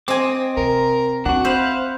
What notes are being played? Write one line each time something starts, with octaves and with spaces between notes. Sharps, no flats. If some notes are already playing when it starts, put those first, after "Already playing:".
C4 D#5 G#5 D6
C3 A#4
C4 D4 F#4 F#5
C5 E5 F5 B5